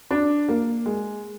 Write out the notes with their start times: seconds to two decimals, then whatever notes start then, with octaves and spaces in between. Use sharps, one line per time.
0.11 D4
0.48 A#3
0.86 G#3